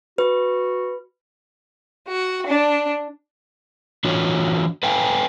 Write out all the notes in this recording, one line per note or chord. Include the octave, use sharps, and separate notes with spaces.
F#4 B4
F#4
D4
E3 D4 F4 F#4 C#5
B4 F5 G5 G#5